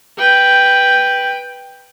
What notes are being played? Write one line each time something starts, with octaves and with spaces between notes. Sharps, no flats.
B4 G5